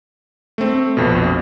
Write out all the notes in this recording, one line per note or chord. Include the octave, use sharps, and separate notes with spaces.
A3 C4
A#1 F2 B2